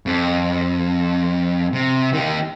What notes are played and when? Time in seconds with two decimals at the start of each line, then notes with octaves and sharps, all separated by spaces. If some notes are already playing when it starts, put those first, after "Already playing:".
0.06 F2
1.73 C3
2.13 D#3 G4